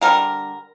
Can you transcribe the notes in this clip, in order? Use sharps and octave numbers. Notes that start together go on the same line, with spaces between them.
D3 G3 A#3 A#4